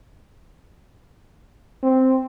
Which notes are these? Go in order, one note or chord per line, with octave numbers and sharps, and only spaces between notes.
C4